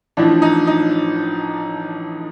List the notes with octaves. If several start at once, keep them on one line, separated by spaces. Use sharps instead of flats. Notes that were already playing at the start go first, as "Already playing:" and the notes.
A1 A2 F3 D4
D#4
D#4